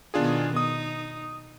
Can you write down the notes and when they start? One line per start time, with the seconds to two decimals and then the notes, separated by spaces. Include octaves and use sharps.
0.14 B2 D#3 B3 D4 F4 G#4
0.56 D#4 D#6